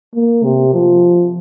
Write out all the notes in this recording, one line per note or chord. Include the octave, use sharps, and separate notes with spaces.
A#3
C3
F3